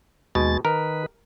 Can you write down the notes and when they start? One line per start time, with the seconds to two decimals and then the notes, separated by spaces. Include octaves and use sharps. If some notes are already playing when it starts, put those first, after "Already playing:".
0.35 D#2 B2 G#3 A6
0.65 D#3 A#4 B4